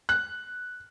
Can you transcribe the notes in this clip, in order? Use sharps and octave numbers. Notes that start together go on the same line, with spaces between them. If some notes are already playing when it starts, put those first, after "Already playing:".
F#6